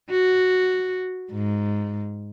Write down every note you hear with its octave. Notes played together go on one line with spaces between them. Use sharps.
F#4
G#2